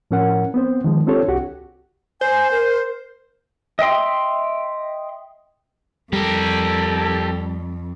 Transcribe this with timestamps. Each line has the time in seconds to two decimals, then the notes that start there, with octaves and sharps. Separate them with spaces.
0.11 A2 F3 C#4 A#4 F#5
0.54 B3 C4 C5
0.84 D#3 F3 G#3
1.07 C4 D4 F4 G4 A4 C#5
1.28 C2 F#4 G4 F#5
2.21 C5 G#5
2.51 A#4
3.79 D#5 E5 G5 C6
6.13 F2 G3 G4 A4 A#4